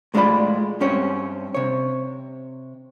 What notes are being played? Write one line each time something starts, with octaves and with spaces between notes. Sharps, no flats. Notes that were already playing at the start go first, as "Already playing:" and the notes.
A2 G#3 C#4 F4 D5 B5
G2 C4 C#4 G4 C#5
C3 C#5